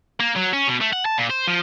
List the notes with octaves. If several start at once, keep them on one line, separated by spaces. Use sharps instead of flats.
A#3
F#3
C#4
B2
A3
F#5
A5
A#2
C5
F3